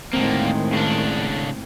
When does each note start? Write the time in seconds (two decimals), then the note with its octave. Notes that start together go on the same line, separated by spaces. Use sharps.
0.13 A2 D3 D#3 G#3 A#3 C4
0.73 C#3 D4